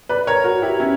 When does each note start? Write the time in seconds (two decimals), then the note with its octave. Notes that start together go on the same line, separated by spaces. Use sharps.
0.09 B4 D5
0.27 A#4 C#5
0.44 F#4 A#4
0.62 E4 G4
0.80 C#4 E4